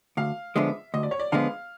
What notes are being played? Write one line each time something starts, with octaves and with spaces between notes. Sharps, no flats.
D2 F5
D3 F3 G#3 B3 E5
D2 D#5
D5
C#5
D5
D3 F3 G#3 B3 F5